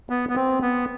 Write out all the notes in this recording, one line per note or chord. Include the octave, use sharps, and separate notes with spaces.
B3
B3
C4
B3